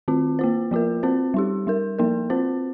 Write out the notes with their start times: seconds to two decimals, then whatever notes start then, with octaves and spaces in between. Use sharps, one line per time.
0.08 D#3 C4 F4
0.39 A#3 F4 C5
0.71 F3 A#3 F4 A#4
1.03 C4 F4 C5
1.34 G3 D#4 G4
1.67 G3 D#4 A#4
1.99 F3 A#3 D#4 A#4
2.30 C4 F4 C5